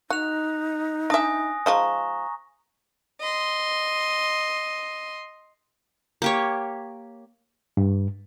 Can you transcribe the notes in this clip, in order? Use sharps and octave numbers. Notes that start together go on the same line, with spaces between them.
D#4 F#4 F#6 F7
D4 E5 G#5 D#6 A#6
F3 G#3 D#4 A#5 C#6
D#5 C6
A#3 G4 C#5
G2